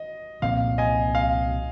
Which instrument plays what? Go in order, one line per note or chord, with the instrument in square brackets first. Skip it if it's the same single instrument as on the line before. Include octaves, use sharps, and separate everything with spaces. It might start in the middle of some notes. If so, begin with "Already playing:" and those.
Already playing: [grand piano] D#5
[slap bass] C2 A#2 F3 C4 [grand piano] F5
[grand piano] D#5 G#5
F5